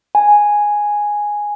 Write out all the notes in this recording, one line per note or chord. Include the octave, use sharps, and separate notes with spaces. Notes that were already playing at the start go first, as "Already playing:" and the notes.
G#5